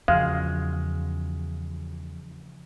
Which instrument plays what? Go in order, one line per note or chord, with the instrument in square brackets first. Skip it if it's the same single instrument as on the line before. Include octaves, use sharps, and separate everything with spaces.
[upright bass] E2 [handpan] C#3 F3 F#4 [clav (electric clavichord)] G#3 [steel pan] F5